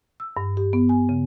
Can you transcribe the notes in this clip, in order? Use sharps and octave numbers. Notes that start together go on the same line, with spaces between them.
E6
G2
G4
B3
G#5
C#3